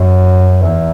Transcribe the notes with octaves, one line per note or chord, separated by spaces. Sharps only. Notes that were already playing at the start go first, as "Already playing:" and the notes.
Already playing: F#2
E2